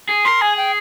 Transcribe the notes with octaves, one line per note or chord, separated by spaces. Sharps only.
G#4
A#4 C6
G#4 G#5
G5